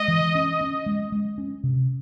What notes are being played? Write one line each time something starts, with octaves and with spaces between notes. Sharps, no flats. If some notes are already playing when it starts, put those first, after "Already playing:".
Already playing: G#3 D#5
E3
C#4
C#4
G#3
G#3
C#4
C3